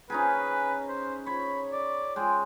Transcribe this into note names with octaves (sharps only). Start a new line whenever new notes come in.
C#4 D#4 G#4 B4
C5
C#5 B5
D5
G#3 G5